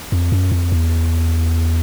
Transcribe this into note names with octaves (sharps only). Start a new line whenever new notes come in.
F2
F#2
F2
E2